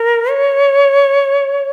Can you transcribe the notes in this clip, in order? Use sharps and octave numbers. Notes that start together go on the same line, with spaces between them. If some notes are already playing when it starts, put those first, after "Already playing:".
Already playing: A#4
C#5